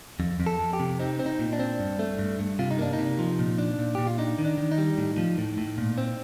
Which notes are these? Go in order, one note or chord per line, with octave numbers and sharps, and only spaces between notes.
F2
F2
A4
F2
G4
C3
C4 D#4
C4
D#4
A#2
D4
C4
G2
A3
G2
G2
C3 F4
D#4
A#3 D4
D#4
C3
F3
A#2
D4
A#2
A#2 G4
F4
D4 D#4
D#3
D4
D#3
D#4
G3
A2
F3
A2
A2
A#2
C4